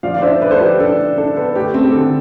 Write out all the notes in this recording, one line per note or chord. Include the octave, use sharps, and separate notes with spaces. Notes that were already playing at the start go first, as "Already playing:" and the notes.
F3 D5 F5
D5
D4 C5 E5
D4 B4 D5
A4 C5
F3 G4 B4
D4 A4
D4
D4 A4
B3 A4
A3 G4
C4 A4
G4
D3 A4